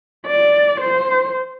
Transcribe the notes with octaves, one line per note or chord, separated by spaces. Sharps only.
D5
C5